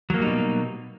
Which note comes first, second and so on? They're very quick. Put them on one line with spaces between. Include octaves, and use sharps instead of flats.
F#3 A#3 G3 D#4 B2